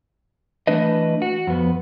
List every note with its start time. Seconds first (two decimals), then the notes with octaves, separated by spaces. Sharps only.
0.67 E3 A3 D4 B4 D#5
1.22 F#4
1.47 F2 B3